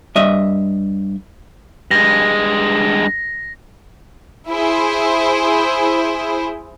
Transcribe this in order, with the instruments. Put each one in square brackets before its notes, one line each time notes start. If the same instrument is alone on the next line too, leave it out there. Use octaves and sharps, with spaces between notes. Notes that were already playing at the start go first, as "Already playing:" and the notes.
[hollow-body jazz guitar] G2 D#5 E5
[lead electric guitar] G2 G#3 [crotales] A#6
[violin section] E4 G#4 C5